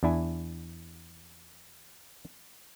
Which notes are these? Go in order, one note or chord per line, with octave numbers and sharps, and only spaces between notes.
E2 D4 E4 G#5